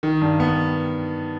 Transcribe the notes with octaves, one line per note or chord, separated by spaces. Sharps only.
D#3
G2
B3